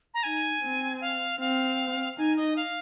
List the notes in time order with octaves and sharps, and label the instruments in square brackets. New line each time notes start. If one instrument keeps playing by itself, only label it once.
[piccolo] A#5
[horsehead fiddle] D#4 [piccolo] G#5
[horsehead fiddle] C4
[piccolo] F5
[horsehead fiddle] C4 [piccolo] F5
[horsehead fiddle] D#4 [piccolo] G#5
[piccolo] D#5
F5